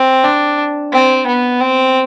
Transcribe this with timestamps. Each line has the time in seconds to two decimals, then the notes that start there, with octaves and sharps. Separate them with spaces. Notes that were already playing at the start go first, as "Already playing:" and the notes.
Already playing: C4
0.24 D4
0.92 C4
1.27 B3
1.60 C4